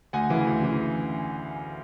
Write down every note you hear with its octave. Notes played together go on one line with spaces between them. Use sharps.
D2 F#5 G#5
C#3 E3
D2
C#3 E3